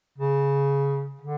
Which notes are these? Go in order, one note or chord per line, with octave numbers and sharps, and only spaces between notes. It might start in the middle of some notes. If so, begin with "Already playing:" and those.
C#3
D3